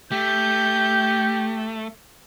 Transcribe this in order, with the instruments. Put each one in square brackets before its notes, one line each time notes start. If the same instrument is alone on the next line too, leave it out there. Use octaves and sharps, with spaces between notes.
[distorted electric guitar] A3 [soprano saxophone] G4 [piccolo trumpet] G6